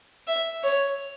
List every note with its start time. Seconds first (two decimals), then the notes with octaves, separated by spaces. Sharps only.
0.27 E5
0.63 C#5